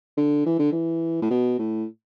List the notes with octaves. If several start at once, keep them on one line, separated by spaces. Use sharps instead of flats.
D3
E3
D3
E3
A2
B2
A2